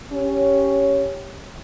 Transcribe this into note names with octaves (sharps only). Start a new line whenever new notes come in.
C#4 G4 C#5